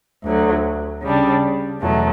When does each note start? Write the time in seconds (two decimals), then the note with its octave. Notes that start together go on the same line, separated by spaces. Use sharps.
0.24 D2 D3 F#3
1.03 C#3 G3 D4
1.81 E2 B2 F#3 A3